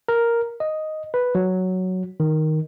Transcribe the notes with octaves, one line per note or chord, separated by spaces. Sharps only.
A#4
D#5
B4
F#3
D#3